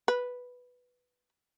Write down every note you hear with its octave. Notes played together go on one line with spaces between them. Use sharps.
B4